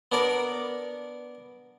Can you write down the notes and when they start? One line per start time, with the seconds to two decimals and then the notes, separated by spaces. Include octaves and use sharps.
0.12 B3 D4 A#4 D5